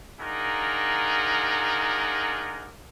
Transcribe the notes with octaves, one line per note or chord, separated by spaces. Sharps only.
D4 D#4 F4 G#4 A#4 F#5